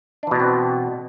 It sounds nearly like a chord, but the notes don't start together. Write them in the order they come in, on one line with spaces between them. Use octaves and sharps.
D4 E3 B2 B3 C4